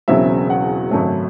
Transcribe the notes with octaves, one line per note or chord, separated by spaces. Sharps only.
E1 E2 C#3 F#3 C4 E5
F#5
G#1 F#2 C#3 F#3 A3